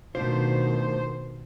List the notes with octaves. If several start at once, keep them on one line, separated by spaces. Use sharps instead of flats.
B2 D#3 A3 D4 F4 C5